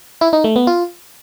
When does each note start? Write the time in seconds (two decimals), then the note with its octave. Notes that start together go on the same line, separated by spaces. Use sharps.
0.21 E4
0.33 D#4
0.44 A3
0.56 B3
0.67 F4